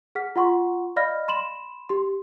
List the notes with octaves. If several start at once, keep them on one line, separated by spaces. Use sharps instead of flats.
G#4 F#5 F6 B6
F4 F#5 C6 C#6
D5 D#5 F5 B5 F6 A#6
B5 C6 E7 F#7
G4 C6